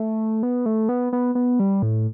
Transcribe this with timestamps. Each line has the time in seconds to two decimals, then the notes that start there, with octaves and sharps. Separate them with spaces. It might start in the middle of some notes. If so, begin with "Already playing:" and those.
Already playing: A3
0.43 B3
0.66 A3
0.89 B3
1.13 B3
1.35 B3
1.60 G3
1.82 A2